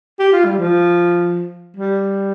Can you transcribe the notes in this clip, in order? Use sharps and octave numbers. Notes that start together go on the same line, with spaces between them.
G4
F4
G3
F3
G3